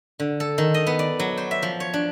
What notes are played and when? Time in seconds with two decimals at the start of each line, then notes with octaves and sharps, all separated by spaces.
0.20 D3
0.40 A4
0.58 D#3
0.74 D#5
0.87 B3
0.99 D5
1.20 F#3
1.37 C5
1.51 E5
1.62 F3
1.80 C#5
1.94 D4